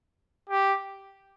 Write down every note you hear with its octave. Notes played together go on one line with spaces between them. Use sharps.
G4